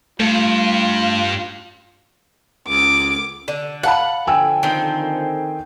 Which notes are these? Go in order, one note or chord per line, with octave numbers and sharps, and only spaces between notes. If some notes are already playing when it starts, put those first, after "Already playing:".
G2 A3 F4
C#2 D6
D3
F5 F#5 A5 B5
D3 F3 A4 G5 G#5 E6
D#3 C4